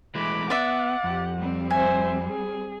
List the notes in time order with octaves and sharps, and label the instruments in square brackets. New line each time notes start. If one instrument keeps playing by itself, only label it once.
[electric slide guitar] E3 G#3 A3 [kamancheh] B5 D6
[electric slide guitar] B3 [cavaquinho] D5 E5 [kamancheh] F#5
[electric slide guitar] F2 [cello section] G4
[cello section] G3 C4
[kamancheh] C5 E5 [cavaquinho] G#5
[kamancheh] G#4